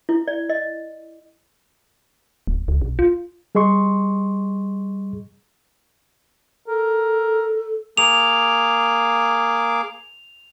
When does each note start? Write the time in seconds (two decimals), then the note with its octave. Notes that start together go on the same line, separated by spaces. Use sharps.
0.09 E4
0.28 D5
0.49 D#5
2.47 D1
2.68 C#2
2.82 B1
2.99 F4
3.55 G3 G#4 D#5 C6 C#6
6.67 A4 A#4
7.97 A#3 G#4 D6 F7